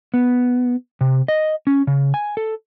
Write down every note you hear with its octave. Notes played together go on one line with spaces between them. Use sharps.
B3
C3
D#5
C#4
C#3
G#5
A4